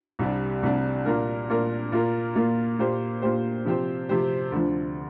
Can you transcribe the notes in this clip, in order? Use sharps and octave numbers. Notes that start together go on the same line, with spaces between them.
C2 C3 G3 D4
C2 C3 G3 D4
A#2 A#3 D4 A#4
A#2 A#3 D4 A#4
A#2 A#3 F4 A#4
A#2 A#3 F4 A#4
A#2 A#3 G4 C5
A#2 A#3 G4 C5
C3 F3 C4 G4 C5
C3 F3 C4 G4 C5
D2 D3 F3